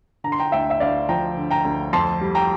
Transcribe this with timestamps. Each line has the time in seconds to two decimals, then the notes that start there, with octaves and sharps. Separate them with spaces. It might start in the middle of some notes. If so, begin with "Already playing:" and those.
0.24 D3 A#5
0.32 C6
0.40 G5 A#5
0.52 D2 E5 G5
0.70 E5
0.80 D2 D5 F5
1.09 F3 G5 A#5
1.37 D3
1.51 G5 A#5
1.65 D2
1.93 F2 A5 C6
2.21 G3
2.35 G5 A#5